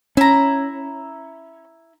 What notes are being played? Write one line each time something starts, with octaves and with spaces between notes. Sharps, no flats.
C#4 E4 A#5